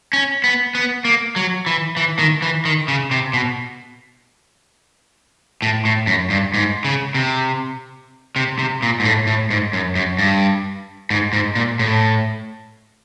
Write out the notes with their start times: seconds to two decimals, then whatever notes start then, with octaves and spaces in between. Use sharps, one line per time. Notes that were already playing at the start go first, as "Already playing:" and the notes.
0.13 C#4
0.44 B3
0.75 B3
1.05 A#3
1.36 F#3
1.66 E3
1.97 E3
2.19 D#3
2.42 E3
2.65 D#3
2.88 C#3
3.11 C3
3.33 B2
5.62 A2
5.85 A2
6.07 F#2
6.30 G2
6.54 G#2
6.85 C#3
7.15 C3
8.36 C3
8.59 C3
8.82 A#2
9.00 G#2
9.05 A2
9.27 A2
9.50 G#2
9.73 F#2
9.96 F#2
10.19 G2
11.10 G#2
11.33 G#2
11.56 A#2
11.79 A2